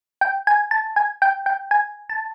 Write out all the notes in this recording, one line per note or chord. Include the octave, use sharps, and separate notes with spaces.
G5
G#5
A5
G#5
G5
G5
G#5
A5